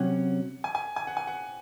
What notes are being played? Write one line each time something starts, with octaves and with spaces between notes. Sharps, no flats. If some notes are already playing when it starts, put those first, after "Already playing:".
Already playing: C3 F#3 C#4 F#5
G#5
G#5
G#5
F#5
G#5
F#5